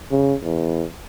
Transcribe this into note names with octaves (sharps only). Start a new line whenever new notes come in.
C#3
E2